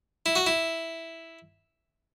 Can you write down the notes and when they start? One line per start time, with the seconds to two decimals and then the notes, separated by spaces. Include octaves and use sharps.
0.26 E4
0.35 F#4
0.46 E4